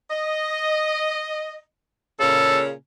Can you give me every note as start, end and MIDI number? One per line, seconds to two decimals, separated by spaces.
0.10 1.61 75
2.20 2.72 46
2.20 2.72 49
2.20 2.59 69